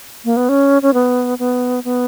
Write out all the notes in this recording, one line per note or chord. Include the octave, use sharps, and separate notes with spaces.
A#3
B3
C#4
C#4
B3
B3
B3